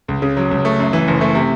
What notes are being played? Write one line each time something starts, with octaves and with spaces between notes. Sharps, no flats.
C#2
C#3
F#3
C#2
A3
F#2
E3
F#1
A3
C3